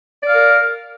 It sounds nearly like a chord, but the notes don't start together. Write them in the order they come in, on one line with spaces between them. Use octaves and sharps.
D5 F5 A#4